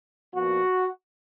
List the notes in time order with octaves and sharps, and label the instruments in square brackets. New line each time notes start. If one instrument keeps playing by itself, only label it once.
[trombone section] A#2 F3 B3 F#4